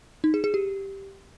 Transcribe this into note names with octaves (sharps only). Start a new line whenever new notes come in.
D#4
G#4
G#4
G4